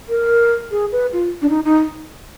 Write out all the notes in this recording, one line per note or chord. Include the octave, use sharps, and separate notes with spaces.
A#4
G#4
B4
F4
D4
D#4
D#4